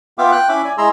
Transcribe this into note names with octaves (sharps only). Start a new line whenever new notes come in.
B3 F4 E5 F5 G5 D6
G5 F#6
C#4 E4 E5 B5 D6
D5 G#5
G#3 E4 G#4 A#5 C6 E6